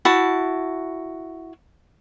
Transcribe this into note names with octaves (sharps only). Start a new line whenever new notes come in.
E4 F#4 A5